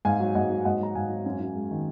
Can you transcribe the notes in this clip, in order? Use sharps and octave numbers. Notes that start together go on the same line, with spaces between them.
G#2 F5 G#5
F#3
G#2 D#5 F#5
F#3
G#2 D#5 F#5
F#3 A#5
G#2 F5 G#5
F#3
F#2
F#2
G#3
D#3